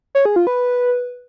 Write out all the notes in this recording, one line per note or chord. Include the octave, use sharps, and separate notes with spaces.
C#5
G#4
F4
B4